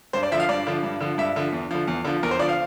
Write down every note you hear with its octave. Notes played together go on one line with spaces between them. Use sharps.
G2 C5
D5
D3 F3 E5
F5
G2 D5
D3 F3
G2
D3 F3
G2 E5
D3 F3
E2
D3 F3
E2
D3 F3
E2 A#4
C5
D3 F3 D5
F5